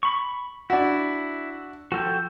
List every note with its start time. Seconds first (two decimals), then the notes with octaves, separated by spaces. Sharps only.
0.03 B5 C#6
0.70 D4 E4 F#4
1.92 F3 F#4 A4 G5